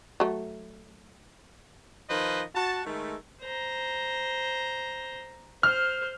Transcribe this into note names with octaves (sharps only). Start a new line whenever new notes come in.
F#3 A3
D#3 F3 B4 C5 D#5
F#4 A5
D#3 G#3 A3
C5 A#5
C5 F6